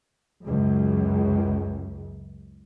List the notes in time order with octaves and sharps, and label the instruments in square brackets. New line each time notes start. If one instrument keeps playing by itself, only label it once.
[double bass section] C#2 F#2